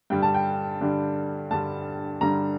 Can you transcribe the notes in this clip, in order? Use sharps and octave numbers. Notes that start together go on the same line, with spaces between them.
G2 D3 G3 G5
A5
G5
G2 D3 G3
G2 D3 G3 A5
G2 D3 G3 A#5